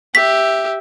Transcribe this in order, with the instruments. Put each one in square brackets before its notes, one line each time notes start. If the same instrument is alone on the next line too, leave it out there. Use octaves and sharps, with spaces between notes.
[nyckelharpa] G4 E5 [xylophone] B6